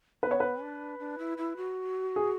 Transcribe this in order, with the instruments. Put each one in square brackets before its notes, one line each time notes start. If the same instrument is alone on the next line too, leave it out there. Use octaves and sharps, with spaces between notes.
[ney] B3 [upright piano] B4
[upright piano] C#5
B4
[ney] D4
D4
E4
E4
F#4
[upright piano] G#4